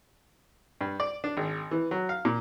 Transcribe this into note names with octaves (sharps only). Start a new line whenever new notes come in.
G2
D5
D4
G#1
E3
F#3
F5
A#2